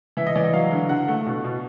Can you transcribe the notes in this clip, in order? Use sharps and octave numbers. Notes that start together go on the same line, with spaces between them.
E3 E5
D#5
E3 D5
D#5
F#3 F5
D3
D3 F#5
A3
B2
B2